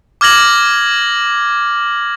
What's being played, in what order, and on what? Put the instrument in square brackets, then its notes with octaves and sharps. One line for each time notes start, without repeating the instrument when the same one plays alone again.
[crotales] D6 F6 G#6 A#6 F#7